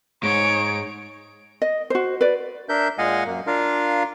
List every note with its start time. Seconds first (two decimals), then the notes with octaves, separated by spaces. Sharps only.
0.23 G#2 C#5 D7
1.62 D#5
1.90 F#4 C5
2.21 B4 D5
2.69 D4 A#4 E5 G6
2.98 A#2 G#3 D#5 F5 F#5 G#5
3.26 F#2 A#3
3.47 D4 F4 A#4 F5